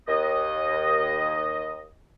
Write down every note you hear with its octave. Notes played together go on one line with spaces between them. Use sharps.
D#2 D#5